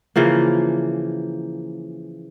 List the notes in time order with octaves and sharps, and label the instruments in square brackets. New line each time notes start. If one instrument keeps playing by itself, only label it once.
[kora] C#3 E3 F3 A#3